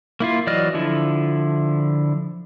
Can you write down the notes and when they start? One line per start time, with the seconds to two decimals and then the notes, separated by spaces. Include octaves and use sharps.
0.20 A#3 E4 F4
0.47 E3 F#3 D5 D#5 F6
0.74 D3 F3 E4